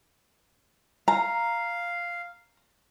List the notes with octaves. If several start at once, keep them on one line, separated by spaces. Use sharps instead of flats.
F5 A#5